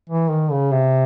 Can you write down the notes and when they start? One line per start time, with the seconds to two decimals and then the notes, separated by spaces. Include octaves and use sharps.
0.09 E3
0.30 D#3
0.51 C#3
0.72 C3